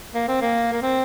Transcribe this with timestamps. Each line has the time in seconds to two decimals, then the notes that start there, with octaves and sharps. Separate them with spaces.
0.14 A#3
0.28 C4
0.41 A#3
0.72 A#3
0.82 C4